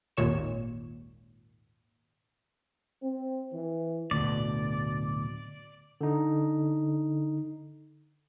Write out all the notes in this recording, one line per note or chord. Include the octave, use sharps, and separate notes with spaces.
G#1 D#2 A#2 C#5 E7
C4
E3
D1 D2 B2 D5
D3 D#4